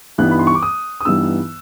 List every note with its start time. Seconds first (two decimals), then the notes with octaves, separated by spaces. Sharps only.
0.18 G2 E3 G3 B3 D#4 F#6
0.31 B5
0.39 C6
0.47 C#6
0.55 D6
0.62 D#6
1.01 D#6
1.05 G2 E3 G3 B3 D#4 E6